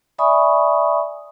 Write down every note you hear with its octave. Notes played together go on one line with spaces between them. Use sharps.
D5 E5 G#5 B5 C#6 D#6